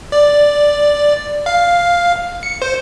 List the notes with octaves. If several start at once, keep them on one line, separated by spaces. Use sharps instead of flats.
D5
F5
C#7
C5